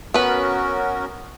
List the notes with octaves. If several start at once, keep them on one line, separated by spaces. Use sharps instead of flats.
B3 C#4 F#4 A#4 B4